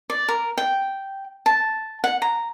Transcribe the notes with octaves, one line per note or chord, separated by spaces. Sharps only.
D5
A#4
G5
A5
F#5
A#5